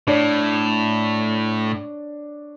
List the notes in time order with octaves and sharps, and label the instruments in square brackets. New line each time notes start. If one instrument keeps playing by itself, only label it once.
[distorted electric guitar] A2 [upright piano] D4 C#5